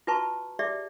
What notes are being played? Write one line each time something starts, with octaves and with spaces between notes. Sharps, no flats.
F4 F#4 B4 A5 A#5 C#6
G4 G#4 D5 E5